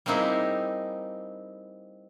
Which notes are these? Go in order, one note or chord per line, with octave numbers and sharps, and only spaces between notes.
G3 A#3 C4 D#4 E4 G#4